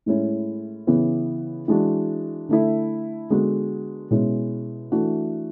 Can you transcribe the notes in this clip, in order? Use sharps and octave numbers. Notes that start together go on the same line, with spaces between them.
A2 G#3 C#4 E4
C#3 E3 B3
E3 G#3 D4 F#4
D3 A3 E4
D3 G#3 B3 F#4
B2 G#3 C#4 E4
E3 A3 D4 F#4